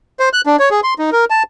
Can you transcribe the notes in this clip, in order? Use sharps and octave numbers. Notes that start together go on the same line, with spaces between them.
C5
F#6
D4
C#5
G#4
C6
D#4
A#4
A5